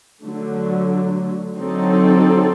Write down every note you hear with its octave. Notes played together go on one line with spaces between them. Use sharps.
D3 F#3 A3
D3 F#3 C4 D#4 A4